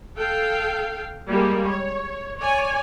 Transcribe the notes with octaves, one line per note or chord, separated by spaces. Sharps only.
A4 F5 G5
G3 G#3 A#3
C#5
C#5 D5 G#5